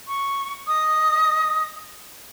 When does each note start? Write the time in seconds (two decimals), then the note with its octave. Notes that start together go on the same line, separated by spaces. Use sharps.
0.08 C#6
0.68 D#5 D#6